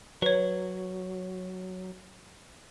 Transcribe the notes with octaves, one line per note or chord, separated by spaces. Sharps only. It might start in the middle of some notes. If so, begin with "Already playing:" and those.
F#3 B4 C#5